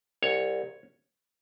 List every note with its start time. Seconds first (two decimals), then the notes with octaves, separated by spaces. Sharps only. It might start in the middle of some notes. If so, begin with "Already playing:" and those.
0.22 C2 C#5